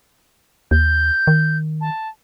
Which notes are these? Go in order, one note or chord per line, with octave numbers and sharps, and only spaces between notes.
D#2 G6
D#3
A5